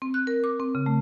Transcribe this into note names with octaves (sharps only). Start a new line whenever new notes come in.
C4
F#6
A#4
D6
C4
C#3
A3